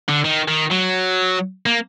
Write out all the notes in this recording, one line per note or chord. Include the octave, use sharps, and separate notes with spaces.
D3
D#3
D#3
F#3
A#3